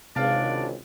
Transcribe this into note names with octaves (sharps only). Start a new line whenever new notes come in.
G#1 C#2 C3 D4 F4 D5